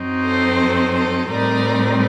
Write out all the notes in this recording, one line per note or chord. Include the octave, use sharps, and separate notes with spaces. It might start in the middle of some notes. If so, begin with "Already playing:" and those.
Already playing: F#2 F#3 C4 D#4
A4 C5
A4 C5
A2 G3 C4 D#4 A#4 D5